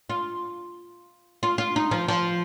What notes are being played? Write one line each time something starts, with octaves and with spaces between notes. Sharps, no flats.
F4
F4
F4
D#4
F3
F3